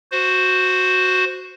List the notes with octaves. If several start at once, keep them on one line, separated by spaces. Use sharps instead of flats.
F#4 C5